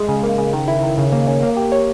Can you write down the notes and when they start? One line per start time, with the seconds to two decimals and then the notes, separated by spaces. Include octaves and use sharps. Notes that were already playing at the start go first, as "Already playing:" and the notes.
Already playing: G#3
0.09 C#3
0.23 A#3
0.38 C#3
0.53 D#3
0.68 E4
0.83 D#3
0.98 C#3
1.12 A#3
1.27 C#4
1.43 A#3
1.57 G4
1.72 C#5